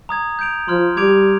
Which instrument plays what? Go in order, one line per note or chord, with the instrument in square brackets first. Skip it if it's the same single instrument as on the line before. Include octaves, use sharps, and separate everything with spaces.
[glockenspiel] A#5 D#6 G#6
G6 D7 F7
[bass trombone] F3 [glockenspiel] C6 F6 G#6
[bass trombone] G3 [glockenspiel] D6 G#6 D7 F7